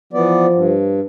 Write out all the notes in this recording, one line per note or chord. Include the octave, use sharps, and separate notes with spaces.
E3 F3 B3 D5
G2